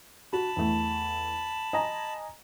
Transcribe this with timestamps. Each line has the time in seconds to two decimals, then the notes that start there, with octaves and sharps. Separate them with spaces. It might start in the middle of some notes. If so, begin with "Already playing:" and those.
0.33 F#4 A5 B5
0.57 E2 A3
1.73 D#5 G#5 A#5